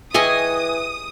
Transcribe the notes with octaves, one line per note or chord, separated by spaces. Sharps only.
E3 E4 G4 G#4 D#5 G#5 C#6 D#6